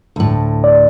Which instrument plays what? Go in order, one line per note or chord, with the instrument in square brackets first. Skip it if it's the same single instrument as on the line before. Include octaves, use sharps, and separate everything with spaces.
[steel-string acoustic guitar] D2 A2
[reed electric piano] D5